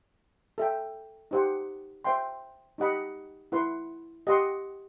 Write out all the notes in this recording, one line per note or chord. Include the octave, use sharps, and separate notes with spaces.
A4 E5 G5
D#4 G4 C5 F#5
C5 E5 G5 C6
D#4 G4 D#5 F#5 B5
E4 B4 F#5 C6
G4 D#5 F#5 C6